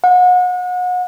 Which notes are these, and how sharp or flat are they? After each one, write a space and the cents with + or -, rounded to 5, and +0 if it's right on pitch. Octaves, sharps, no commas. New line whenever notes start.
F#5 -35